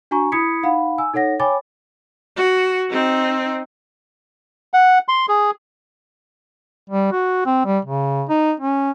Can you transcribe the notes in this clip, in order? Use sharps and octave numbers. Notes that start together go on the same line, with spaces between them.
D4 F#4 G#5 A#5 C#6
E4 B5 D#6 G#6 B6 C#7
D#4 F5 F#5 B5
G#5 E6
D#4 A4 C#5 F#5 A#6
C#5 G5 G#5 B5 D6 A6
F#4
C4 D#4
F#5
C6
G#4
G3
F#4
C4
G3
C#3
D#4
C#4